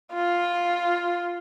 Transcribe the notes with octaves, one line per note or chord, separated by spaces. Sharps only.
F4